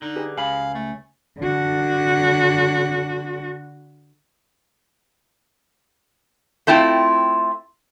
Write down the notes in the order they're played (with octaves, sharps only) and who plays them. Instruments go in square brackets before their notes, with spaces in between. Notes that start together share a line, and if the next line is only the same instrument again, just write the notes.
[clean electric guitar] D3 [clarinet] D#4
[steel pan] G4 G#4 B4
[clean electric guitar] C#2 B5 [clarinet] F5 [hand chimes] G#5
[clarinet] A3
[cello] D3 F#4
[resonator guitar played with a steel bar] A3 C4 E4 F4 G5